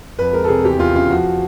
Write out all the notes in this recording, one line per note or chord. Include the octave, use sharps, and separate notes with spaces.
F2 B4
G#3 A#4
A4
C3 G#4
E2 G4
E2 F4
C#3 F4
F3 F#4